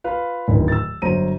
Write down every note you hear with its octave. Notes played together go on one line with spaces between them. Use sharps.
F4 B4 F5
D1 D#3
E6 A6
G1 F#3 C5 A#5 D#7